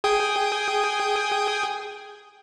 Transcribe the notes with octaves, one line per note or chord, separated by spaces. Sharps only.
G#4 G5 D#6